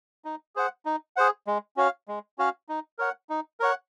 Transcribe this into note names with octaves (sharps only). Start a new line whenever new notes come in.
D#4
G#4 C5 F#5
D#4
G#4 C5 F#5
G#3
C#4 F#4 C#5 F5
G#3
C#4 F#4 C#5 F5
D#4
A#4 C#5 F#5
D#4
A#4 C#5 F#5